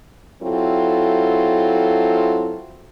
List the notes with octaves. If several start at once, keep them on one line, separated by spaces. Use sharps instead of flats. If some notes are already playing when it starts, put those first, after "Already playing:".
F#3 C4 E4 F4 A4